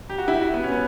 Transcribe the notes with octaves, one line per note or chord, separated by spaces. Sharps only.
G4
F#4
E4
F#4
B3
C#4
B3